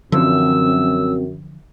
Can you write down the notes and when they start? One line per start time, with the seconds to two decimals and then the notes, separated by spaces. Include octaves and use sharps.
0.12 F#2 D3 E3 F3 C4 E6